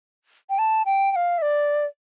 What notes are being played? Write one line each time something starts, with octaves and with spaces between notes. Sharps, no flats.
G5
A5
G5
G5
F5
E5
D5